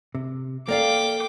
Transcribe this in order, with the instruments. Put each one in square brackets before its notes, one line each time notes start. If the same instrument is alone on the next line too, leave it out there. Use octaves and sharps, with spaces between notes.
[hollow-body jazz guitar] C3
[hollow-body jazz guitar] A#3 [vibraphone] A4 [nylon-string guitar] A#4 D5 F5 [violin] G5 D6